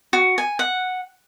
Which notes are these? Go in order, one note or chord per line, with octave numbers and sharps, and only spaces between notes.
F#4
G#5
F#5